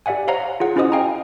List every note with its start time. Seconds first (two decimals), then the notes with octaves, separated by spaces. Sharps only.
0.06 G4 D5 E5 F#5 G#5
0.28 C5 C#5 F5 F#5 A#5
0.60 F4 G#4 F#5
0.76 C#4 E4 F#4 C5 D#5 D#6
0.92 D#5 F5 G5 G#5 A#5